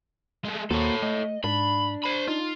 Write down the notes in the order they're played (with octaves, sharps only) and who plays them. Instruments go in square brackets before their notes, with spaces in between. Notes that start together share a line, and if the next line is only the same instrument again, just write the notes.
[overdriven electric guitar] G#3 A3
[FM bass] D#2 [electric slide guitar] A#3 F#4 C5 [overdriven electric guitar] A4 C#5
[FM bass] A3 [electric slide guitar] D#5
[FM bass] G#2 [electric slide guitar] D4 [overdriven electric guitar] B5
[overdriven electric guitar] C5 B5
[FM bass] D#4 [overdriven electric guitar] F4